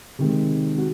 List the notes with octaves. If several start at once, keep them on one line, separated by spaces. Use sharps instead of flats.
C3 D#3 G#3
F#4